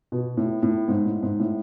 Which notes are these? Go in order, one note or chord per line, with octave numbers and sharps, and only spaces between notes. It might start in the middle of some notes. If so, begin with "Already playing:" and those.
B2
A2
A2
G#2
A2
G#2
A2